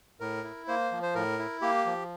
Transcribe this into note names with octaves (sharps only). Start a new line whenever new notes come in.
A2 A#4
E4
A#3 C5
F3
C5
A2 A#4
E4
A#3 G4
F3